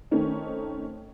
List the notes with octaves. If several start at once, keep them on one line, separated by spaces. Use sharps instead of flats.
D#3 A3 C4 C#4 D#4